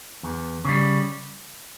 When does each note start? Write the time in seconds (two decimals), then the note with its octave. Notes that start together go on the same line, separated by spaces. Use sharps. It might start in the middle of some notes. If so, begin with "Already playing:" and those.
0.23 E2
0.65 C#3 G3